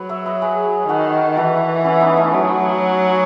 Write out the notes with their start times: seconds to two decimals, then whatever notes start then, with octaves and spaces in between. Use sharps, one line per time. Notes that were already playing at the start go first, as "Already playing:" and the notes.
Already playing: F#3 B4
0.09 C#5 E5
0.25 B4 D#5
0.42 G#4 B4
0.89 D#3 F#4 A4
1.37 E3 F#4 A4
1.84 C#4 E4
2.01 B3 D#4
2.17 A3 C#4
2.33 F#3